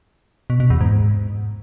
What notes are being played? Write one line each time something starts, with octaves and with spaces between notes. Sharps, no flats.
B2
B2
E2
G#2